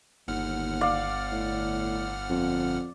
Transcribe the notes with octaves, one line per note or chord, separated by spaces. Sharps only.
G1 D#2 F#5 F6
D5 F5
A2
F2